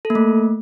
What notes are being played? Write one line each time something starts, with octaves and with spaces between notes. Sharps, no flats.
A4
A#3
A3